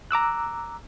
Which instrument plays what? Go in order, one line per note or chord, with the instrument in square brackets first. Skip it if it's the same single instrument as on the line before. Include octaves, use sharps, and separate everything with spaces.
[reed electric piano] A#5 D6 E6 F#6